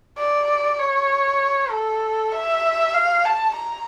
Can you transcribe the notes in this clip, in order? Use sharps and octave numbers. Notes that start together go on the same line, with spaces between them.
D5
C#5
A4
E5
F5
A5
A#5